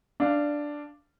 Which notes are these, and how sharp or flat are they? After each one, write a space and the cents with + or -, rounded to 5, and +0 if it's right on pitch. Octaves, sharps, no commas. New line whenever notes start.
D4 +0 F5 -20